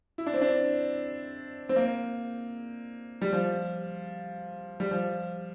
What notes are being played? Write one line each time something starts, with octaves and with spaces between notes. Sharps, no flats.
E4
D4
C4
D4
C4
A#3
G3
F3
G3
F3